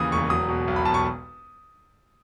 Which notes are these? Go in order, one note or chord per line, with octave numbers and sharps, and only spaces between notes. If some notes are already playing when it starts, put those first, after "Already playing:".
Already playing: D#2 C#3 E3 D#6
E1 C#6
F#3 D#6
B2
B1
B5
B1 A5
C#6